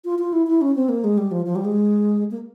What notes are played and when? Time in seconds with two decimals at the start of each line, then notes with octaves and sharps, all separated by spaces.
0.05 F4
0.19 F4
0.33 E4
0.47 E4
0.61 C#4
0.75 C4
0.89 A#3
1.04 G#3
1.18 G3
1.31 F3
1.46 F3
1.56 G3
1.65 G#3
2.31 A#3